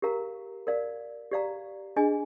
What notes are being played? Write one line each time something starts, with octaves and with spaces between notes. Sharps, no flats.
G4 A#4 F5 A#5
A#4 D5 F5
G4 D5 F5 A#5
D4 G#4 D#5 G#5